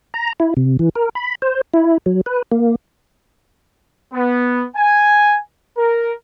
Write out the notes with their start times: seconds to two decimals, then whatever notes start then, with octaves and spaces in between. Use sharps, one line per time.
0.14 A#5
0.40 E4
0.57 C3
0.79 E3
0.95 A#4
1.15 B5
1.42 C5
1.74 E4
2.06 F#3
2.26 B4
2.51 A#3
4.13 B3
4.76 G#5
5.78 A#4